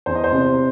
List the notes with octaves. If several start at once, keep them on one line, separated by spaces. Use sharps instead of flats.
E2 C5
D#5
C5
C3